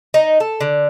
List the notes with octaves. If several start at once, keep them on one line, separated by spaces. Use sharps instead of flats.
D#4
A4
D3